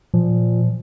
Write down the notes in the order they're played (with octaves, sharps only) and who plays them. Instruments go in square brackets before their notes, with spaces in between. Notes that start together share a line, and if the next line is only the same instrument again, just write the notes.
[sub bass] A#2 [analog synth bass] F3